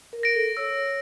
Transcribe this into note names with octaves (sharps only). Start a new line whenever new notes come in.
A#4
A#6 D7
A4
C#5 E6